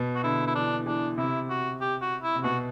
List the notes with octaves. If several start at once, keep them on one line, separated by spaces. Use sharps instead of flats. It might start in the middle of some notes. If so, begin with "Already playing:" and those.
Already playing: B2
F#4
D3 E4
E4
E3 D4
E3 D4
C3 E4
F#4
G4
F#4
E4
C3
B2 F#4